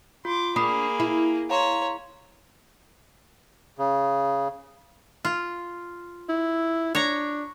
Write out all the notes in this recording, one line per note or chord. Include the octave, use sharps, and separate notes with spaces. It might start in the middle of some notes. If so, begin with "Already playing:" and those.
F4 C6 D6
A#3 D4 G#4 B5 D#6 C7
E4
C#5 F5 A#5 C6
C#3
F4
E4
D4 C#5 A#5